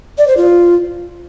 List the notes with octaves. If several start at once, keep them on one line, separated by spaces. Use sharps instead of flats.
D5
C5
F4